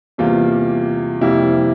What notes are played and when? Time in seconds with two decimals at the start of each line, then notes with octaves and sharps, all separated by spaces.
0.18 E2 C3 G3 A#3 F4
1.21 F2 C3 G3 A#3 E4